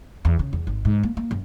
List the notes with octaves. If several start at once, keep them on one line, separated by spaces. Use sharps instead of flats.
E2
C#3
E2
G#1
G#2
A#3
A#3
F#2